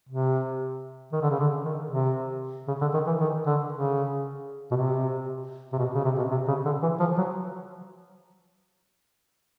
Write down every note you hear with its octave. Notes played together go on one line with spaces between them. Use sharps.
C3
D#3
D3
C#3
D3
D#3
C3
C#3
D3
D#3
E3
D#3
D3
C#3
B2
C3
C3
B2
C#3
C3
B2
C3
C#3
D3
E3
F3
F#3